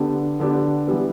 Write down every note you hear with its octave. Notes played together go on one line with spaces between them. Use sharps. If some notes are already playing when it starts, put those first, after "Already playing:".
Already playing: D3 B3 D4 G4
D3 B3 D4 G4
E3 G3 B3